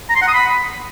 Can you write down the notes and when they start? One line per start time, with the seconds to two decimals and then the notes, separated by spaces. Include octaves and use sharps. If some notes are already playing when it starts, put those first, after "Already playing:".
0.10 A#5
0.16 C6
0.22 F#5
0.28 D#6
0.34 B5